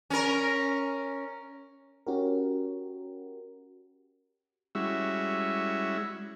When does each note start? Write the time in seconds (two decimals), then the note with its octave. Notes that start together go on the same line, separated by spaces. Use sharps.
0.10 C#4 A#4
2.07 C#4 F#4 G4 A#4
4.75 G3 G#3 C#4 E4 F#4 E5